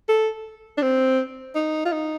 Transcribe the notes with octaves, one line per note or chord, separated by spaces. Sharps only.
A4
D4
C4
D#4
F4
D#4